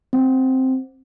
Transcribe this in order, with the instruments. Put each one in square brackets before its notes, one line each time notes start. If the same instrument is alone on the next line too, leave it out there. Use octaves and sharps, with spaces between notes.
[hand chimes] C4